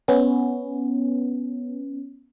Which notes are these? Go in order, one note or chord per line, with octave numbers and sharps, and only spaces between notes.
B3 C#4